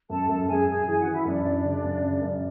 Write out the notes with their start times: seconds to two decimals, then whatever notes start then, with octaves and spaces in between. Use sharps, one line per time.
0.10 F#2 A4 A5
0.29 F#2 A4 A5
0.48 F#2 G#4 G#5
0.68 F#2 G#4 G#5
0.87 E3 G#4 G#5
1.00 F#4 F#5
1.06 E3
1.12 E4 E5
1.25 F#2 D4 D5
1.45 F#2
1.64 C#3
1.83 F#2
2.03 C#3
2.21 F#2